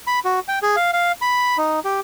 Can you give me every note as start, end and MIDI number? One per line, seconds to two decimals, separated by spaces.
0.07 0.19 83
0.25 0.40 66
0.48 0.59 79
0.63 0.76 68
0.76 0.91 77
0.93 1.12 77
1.21 1.57 83
1.58 1.80 63
1.85 2.00 67